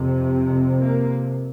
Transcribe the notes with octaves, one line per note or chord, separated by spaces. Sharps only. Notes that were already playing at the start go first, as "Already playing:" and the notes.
Already playing: F2 C3
A#3